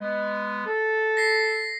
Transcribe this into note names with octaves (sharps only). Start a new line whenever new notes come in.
G#3 B3
A4
A#6 C7